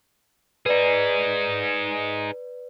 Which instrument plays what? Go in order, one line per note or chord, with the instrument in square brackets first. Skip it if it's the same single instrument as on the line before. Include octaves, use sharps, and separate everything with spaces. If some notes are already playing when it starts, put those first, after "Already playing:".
[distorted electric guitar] D#4 G#4 [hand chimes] B4 D5